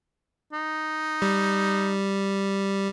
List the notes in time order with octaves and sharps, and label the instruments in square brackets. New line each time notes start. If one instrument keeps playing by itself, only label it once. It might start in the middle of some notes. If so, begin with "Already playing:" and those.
[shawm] D#4
[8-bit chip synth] G3